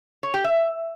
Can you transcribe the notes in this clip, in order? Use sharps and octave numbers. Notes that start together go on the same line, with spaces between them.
C#5
G4
E5